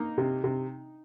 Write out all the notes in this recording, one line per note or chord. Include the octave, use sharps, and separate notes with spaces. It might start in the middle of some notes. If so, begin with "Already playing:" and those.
Already playing: A#3 D#4
C3
C3